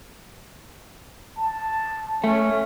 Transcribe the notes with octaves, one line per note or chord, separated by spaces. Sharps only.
A5
A3 C#4